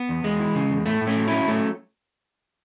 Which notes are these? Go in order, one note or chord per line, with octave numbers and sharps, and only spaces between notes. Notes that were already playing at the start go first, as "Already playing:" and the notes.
Already playing: B3
E2
E2 G#3
E3
C#3
E2
A2 A3
A2
A3 C#4
F#3
F#3 C#4 E4
A2 A3 C#4